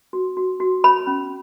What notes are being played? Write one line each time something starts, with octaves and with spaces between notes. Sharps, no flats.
F#4
F#4
F#4
C#5 B5
C#4